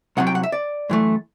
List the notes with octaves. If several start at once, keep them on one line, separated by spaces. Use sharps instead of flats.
C2 C3 F#3 F#5
G5
F#5
E5
D5
F#2 E3 A3